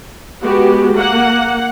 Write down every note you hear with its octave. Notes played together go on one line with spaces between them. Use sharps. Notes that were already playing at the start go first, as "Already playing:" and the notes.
G#3 B3 F#4 G4
A#3 F#5